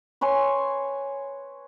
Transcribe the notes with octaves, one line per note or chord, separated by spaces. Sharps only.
B4 C#5 G#5 C6